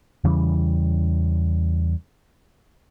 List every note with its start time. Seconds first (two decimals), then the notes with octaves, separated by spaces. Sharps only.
0.24 E2 C#3 E3 G3